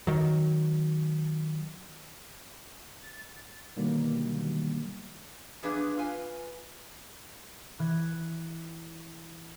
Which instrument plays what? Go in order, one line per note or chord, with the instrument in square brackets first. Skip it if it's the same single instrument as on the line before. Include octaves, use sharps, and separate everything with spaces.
[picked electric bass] D#3 F#3
[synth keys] A6
B2 D3 D#3 F#3 G3 A#3
[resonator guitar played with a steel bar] E3 F3 B3 D4 G#4 B4
F4 B4 G#5
[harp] E3 F#6 G#6